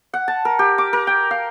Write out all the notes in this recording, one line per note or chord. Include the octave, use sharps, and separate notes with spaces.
F#5
A5
A#4
G4
D6
A#4
G5
F5